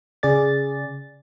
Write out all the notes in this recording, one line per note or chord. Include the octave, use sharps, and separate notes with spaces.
C#3 G#4 D5 A6